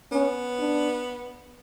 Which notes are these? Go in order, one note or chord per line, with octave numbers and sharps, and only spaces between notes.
B3 C#4
D4